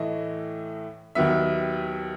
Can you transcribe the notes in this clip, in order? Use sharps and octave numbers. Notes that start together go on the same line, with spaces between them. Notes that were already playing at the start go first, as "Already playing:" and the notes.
Already playing: A2 E3 A3 D#5
D#2 D#3 F#3 B3 E5